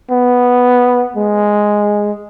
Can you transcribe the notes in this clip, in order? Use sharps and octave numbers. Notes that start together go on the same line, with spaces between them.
B3
G#3